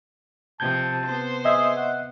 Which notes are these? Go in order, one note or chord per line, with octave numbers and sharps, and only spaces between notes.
C3 F3 A5 G6 G#6
B3 C5
G#4 D#5 E5
F#5